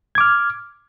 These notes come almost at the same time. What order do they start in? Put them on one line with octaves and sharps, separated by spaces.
G#6 D6 F6